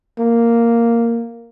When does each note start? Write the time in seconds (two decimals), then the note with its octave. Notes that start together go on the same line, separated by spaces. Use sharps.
0.19 A#3